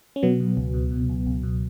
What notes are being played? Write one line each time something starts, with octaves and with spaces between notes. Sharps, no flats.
C#4
B2 F#3 B3
B2
C#2
B2
B2
C#2
C#2
B2